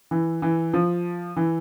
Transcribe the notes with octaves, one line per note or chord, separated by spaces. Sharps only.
E3
E3
F3
E3